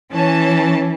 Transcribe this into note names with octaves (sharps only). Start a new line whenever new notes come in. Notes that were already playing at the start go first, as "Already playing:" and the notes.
E3 C#4 A5